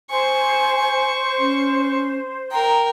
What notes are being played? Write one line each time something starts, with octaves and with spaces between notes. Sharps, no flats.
C5 G#5 C#6
C#4
A#4 G5 A#5